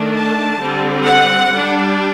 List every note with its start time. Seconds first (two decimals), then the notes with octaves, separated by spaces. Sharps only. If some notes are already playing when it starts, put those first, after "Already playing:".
Already playing: D#3 A3 D4
0.16 A5
0.61 D3 G3 C4
1.05 F#5
1.51 G3 D4